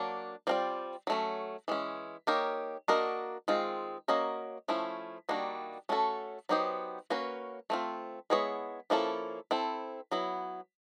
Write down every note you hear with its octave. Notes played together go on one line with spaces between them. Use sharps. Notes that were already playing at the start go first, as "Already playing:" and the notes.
Already playing: F#3 A#3 D4
G3 C4 F4 A#4 D5
F#3 A3 C#4
E3 G#3 C#4
A#3 D#4 G4 A#4 C#5
A#3 D4 F#4 A#4 D#5
D#3 G#3 C4 F4
A#3 C#4 F#4 A#4 D#5
F3 A3 C#4 E4
D#3 G3 A#3 D4 F#4
A3 C#4 F#4 A4
F#3 B3 D#4 G4 C5
A#3 C#4 F#4 B4
A3 C4 F4
G#3 B3 E4 G#4 C#5
F3 A#3 C#4 E4 A4
C4 E4 A4
F#3 B3 E4